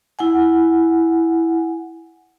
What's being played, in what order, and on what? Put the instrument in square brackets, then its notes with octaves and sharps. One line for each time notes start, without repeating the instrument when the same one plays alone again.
[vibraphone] E4 F#5 G#5